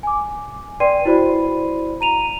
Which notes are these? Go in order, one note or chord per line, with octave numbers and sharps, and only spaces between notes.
G#5 D6
B4 D5 G5 C6 C7 D#7
E4 F#4 C5 D5 B5
A#5 D#7 F7